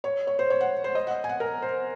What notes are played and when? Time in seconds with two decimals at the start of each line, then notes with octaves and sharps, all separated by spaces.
0.04 C#5
0.27 C#5
0.39 C5
0.50 C#5
0.61 F#5
0.84 C5
0.95 D#5
1.07 F#5
1.24 G#5
1.29 F#5
1.40 A#4
1.62 C5